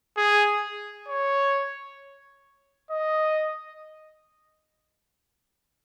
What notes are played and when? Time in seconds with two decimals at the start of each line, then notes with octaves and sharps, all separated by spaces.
0.17 G#4
1.08 C#5
2.91 D#5